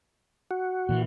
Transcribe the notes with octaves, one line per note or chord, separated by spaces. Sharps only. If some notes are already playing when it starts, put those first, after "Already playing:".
F#4
A#2 E3